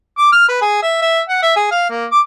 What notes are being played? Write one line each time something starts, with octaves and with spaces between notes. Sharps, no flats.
D6
F6
B4
G#4
E5
E5
F#5
E5
G#4
F5
A#3
D6